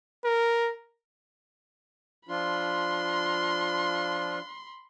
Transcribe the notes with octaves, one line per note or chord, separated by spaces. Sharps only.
A#4
F3 D4 F4 B5 C6